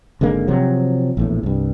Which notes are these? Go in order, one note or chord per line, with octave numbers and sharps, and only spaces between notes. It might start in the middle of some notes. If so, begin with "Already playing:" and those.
G#1 D3 G#3 A#3
C3 F3 F#3
A#1 E2 A2
C2 G2